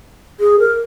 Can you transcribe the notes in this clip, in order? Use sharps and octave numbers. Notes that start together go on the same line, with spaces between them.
G#4
A#4